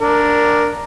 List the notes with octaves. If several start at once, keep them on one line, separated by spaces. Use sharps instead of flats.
D4 A#4